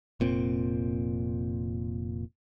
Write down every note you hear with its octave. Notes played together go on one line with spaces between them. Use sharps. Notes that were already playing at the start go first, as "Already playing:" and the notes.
F1 A#2 C4